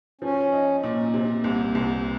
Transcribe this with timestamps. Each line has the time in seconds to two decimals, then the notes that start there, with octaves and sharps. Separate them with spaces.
0.21 F3 C#4
0.52 D#4
0.83 A#2
1.14 C3
1.44 C2
1.75 C2